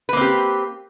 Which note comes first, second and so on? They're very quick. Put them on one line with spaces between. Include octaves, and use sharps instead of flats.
B4 A#3 C4 G4